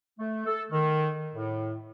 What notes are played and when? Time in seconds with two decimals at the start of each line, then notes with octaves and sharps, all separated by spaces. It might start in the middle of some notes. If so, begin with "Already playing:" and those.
0.19 A3
0.46 A4
0.71 D#3
1.34 A2